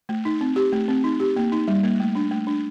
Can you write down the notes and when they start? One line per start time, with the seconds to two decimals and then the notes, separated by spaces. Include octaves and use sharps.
0.09 A3
0.25 D#4
0.41 C4
0.56 G4
0.73 A3
0.88 C4
1.04 D#4
1.20 G4
1.36 A#3
1.52 D#4
1.68 G3
1.83 A#3
2.00 A3
2.15 D4
2.31 A3
2.47 D4